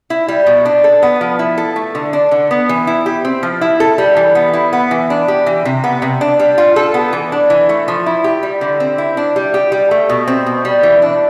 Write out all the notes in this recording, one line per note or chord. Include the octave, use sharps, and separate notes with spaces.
E4
G3
B2
D4
A4
B3
F3
E4
A4
A3
D3
D4
D3
B3
E3
E4
G4
C4
F3
E4
A4
G3
E3
B3
E4
B3
E3
D4
G4
E3
C3
B3
C3
D4
G3
F4
A4
B3
E3
D4
E3
A3
F3
E4
G4
G3
D3
C4
E4
D4
G3
G4
G3
A3
B2
C4
B2
G3
E3
D4